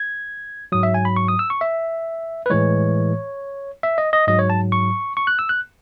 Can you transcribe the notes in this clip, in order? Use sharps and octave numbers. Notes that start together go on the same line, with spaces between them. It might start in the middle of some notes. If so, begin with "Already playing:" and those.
Already playing: G#6
G#2 F#3 D#6
E5
G#5
B5
C#6
D#6
E6
C#6
E5
B4
A2 E3 G#3 C#5
E5
D#5
D#5
G#2 F#3 D#5
C#5
A5
C#6
C#6
F#6
E6
F#6